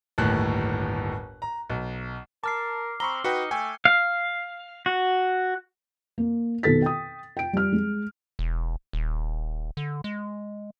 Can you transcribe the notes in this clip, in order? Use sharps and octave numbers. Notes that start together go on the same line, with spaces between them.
G1 D#2 A2 F#6
A#5
B1
A#4 A5 D6 F6 C7
C4 A#5 B5 C#6 G7
D#4 F#4 B4 G5 C#7
A3 G5 G#5
F5
F#4
A#3
B2 D#3 A4 A6 B6
G5 D#6
G5 D7
G3 F6
G#3
E1
D#1
D3
G#3